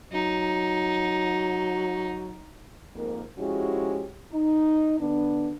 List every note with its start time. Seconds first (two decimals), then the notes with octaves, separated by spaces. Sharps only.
0.12 F#3 D#4
2.95 F2 G#2 A#3 A#4
3.37 F3 G#3 C#4 E4 F#4 G4
4.33 D#4
4.98 D3 B3 D4